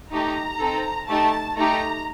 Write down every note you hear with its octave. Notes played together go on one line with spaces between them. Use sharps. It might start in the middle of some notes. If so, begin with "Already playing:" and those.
A3 D#4 G4 A#5
C4 D#4 A4
A3 D#4 G4 A5
A3 D#4 G4 A#5